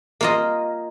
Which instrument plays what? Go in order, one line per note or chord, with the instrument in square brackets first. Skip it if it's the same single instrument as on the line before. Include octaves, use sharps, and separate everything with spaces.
[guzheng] A#3 F4 D#5